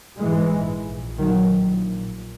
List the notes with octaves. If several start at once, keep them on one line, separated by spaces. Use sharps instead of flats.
A#1 G#2 E3 G#3
A#1 A#2
D#3 F#3
A#1 A#2